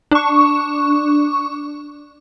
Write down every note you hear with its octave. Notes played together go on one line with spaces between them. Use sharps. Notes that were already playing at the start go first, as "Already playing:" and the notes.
D4 C#6